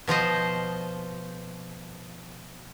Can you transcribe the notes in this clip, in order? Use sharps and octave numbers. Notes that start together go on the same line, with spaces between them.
B2 F3 C5 D#5